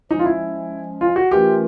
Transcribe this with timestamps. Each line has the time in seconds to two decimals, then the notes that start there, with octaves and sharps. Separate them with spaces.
0.11 F3 G#3 C#4 D#4
0.19 F4
0.26 E4
1.01 F4
1.16 F#4
1.31 E3 A3 C#4 F4 G4 A#4